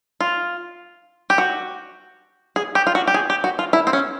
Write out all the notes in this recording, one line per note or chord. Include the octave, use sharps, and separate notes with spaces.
F4
G4
F#4
G#4
G4
F4
F#4
G4
G#4
G4
F#4
F4
E4
C4
C#4